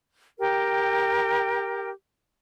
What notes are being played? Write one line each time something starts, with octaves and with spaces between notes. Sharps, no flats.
G4 A#4 G5